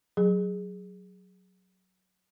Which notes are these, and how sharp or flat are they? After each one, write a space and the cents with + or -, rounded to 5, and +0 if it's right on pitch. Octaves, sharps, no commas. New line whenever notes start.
F#3 +0 G#4 -5